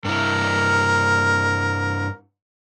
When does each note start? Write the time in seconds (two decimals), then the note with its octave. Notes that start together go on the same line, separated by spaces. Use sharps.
0.05 G2 E4 A#4